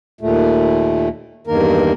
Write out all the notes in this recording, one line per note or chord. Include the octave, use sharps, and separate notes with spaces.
D#2 A#2 A3
E2 G2 D#3 A#3 A#4